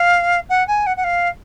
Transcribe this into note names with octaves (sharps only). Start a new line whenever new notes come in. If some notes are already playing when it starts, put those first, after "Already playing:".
Already playing: F5
F#5
G#5
F#5
F#5
F5